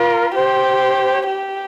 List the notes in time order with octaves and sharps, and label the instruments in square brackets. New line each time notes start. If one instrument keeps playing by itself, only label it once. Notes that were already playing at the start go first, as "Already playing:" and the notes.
Already playing: [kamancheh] F4 [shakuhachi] A#4
[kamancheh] G4 [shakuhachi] C5
[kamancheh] G4